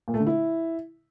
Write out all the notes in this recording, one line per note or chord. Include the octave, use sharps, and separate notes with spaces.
A#2
A3
D3
E4